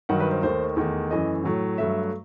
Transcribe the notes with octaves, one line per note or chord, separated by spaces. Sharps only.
G2 D#3 F#3 F#5
B4
C5
D#2 D#3 A3 C5
E2 D#3 A3
F#2 E3 A3 D#5
A2 F#3 A3
G2 F#3 A3 E5